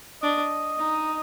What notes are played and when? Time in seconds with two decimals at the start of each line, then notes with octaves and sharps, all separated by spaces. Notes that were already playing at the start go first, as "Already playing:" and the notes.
0.22 D4 D#5
0.78 D#4